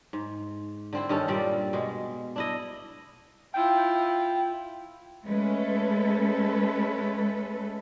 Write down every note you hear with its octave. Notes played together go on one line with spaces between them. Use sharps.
G#2
D3 C4 E4
G2 D#3 C#4 A4
A#2 G3 D5
B2 G#3
D4 E4 D#5
E4 F4 G5
G#3 A3 C#4 A4 B4